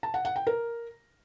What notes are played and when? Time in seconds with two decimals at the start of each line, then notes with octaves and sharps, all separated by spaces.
0.03 A5
0.14 F#5
0.25 F#5
0.36 G5
0.47 A#4